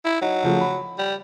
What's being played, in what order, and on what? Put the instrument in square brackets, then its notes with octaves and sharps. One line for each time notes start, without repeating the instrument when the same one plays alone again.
[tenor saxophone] E4
[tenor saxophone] F#3 [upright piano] D#4
[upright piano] C#3 F3 A3
B5
[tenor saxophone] G3